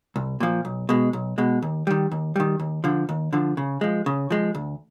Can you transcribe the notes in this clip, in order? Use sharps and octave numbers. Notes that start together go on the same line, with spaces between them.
C2
A#2 F3
B1
B2 G#3
B1
B2 G#3
D#2
D#3 G3
D#2
D#3 G3
D#2
D3 F3
D#2
D3 F3
C#3
F3 G#3
C#3
F3 G#3
D2